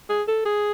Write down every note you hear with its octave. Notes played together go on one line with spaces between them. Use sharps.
G#4
A4
G#4